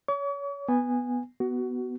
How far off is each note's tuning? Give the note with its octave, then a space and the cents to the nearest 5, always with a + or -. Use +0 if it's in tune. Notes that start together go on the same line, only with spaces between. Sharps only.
C#5 +25 C#6 +45
B3 +0 G#5 -15
B3 +0 F#4 +20